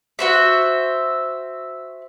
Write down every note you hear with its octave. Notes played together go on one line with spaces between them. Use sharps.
F#4 C5 E5